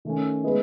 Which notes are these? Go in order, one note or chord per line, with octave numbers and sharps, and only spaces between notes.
D#3 A3 C#4
G#3 B3 E4 B4 D#5